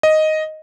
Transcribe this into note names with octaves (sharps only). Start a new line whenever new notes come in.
D#5